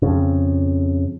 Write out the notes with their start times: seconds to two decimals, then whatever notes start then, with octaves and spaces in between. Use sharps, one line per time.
0.02 F2 C#3